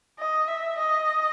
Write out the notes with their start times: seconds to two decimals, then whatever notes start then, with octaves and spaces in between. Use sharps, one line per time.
0.19 D#5
0.48 E5
0.78 D#5